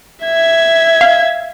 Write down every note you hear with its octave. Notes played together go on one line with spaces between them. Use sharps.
E5 G#6
F5